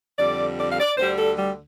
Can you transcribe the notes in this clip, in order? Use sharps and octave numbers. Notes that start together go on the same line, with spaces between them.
F2 D3 G3 D5
D5
F5
D5
D2 D3 G3 C5
A4
G3